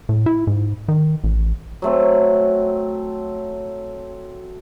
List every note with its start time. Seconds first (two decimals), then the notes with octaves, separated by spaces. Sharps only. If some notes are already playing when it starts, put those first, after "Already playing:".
0.09 A2
0.26 E4
0.47 G#2
0.88 D#3
1.24 A1
1.82 F#3 A3 C4